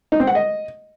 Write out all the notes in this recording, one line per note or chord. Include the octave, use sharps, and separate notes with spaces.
D#4
C4
F#5
D#5